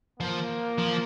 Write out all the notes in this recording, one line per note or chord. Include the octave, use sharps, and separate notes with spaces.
F3 A#3
F3